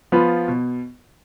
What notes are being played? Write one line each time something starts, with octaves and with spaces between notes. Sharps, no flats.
F3 B3 F4 B4
B2